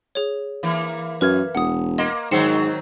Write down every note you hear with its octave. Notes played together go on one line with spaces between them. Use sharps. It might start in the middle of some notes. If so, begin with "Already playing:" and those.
G#4 C#5
E3 A#3
F#2 B4 F6 G#6
E1 F#5 D#6
A#3 D#5 C6 A#6
G#2 D#3 F#3 C4 C7 C#7 E7